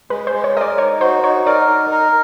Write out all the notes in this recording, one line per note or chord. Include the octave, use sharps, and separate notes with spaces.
G#3 B4
C5
G#3
C#5
A#4 D#5
D5
D#4 C#5
F#4 C5
D#4 C#5
A#4 D5
D#4
A#4